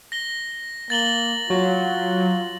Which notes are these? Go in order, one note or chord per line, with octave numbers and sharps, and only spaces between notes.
A#6 G7
A#3 A6 F#7 G7
F#3 F4